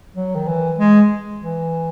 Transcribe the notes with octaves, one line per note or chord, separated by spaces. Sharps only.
F#3
D#3
E3
G#3
E3